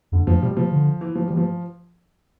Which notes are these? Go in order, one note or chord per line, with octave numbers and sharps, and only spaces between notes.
F2 D3
F2 F3
B2 G3
C3 F3
D3
E3
F3
E3 G3
F3